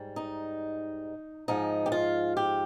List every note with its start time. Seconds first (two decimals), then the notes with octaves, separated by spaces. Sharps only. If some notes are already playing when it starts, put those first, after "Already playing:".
Already playing: G#2 G3
0.16 D#4
1.48 G#2 F3 G#3 D#4
1.86 G4
1.92 F4
2.37 G4